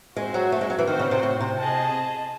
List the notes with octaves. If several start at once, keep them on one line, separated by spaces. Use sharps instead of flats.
G#3 C4 F#4 C5 E5
F#3
A3
G#3
F#3
E3
D#3 C4 F#4 C5
C#3
C3
A2
C3
G#4 D#5 A5